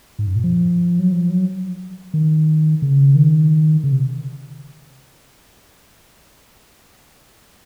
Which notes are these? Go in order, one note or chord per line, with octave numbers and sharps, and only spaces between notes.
G#2
F#2
A#2
F3
F#3
F3
F#3
D#3
C#3
D#3
C#3
C3